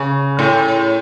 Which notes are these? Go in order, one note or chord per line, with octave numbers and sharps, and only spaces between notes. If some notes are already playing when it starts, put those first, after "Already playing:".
Already playing: C#3
A2